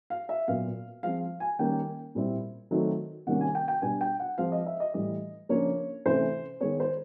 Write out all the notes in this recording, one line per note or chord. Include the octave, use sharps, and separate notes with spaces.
F5
E5
A#2 F#3 B3 F5
F3 G#3 C4 F5
G#5
D#3 G3 A#3 C#4 G5
A#2 G3 C4 E4
D#3 F#3 A3 C4 D#4
C3 D#3 G3 A#3 C#4 F#5
G#5
G5
G5
B2 G3 B3 D4 G#5
G5
F#5
F3 G#3 C4 F5
D#5
E5
D#5
A2 E3 G3 D#5
C#3 F3 A#3 D4 C#5
C3 E3 A3 C#4 E4 C5
D#3 G#3 B3 C#5
C5